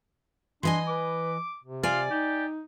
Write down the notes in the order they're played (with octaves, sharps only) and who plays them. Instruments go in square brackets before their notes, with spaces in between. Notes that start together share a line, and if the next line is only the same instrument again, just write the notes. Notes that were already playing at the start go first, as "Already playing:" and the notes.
[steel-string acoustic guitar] E3 D#5 G#5 [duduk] D4 [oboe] C6
[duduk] B4 [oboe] D6
[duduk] C3
[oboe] F4 [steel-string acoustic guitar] D5 G#5
[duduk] D#4 [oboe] G4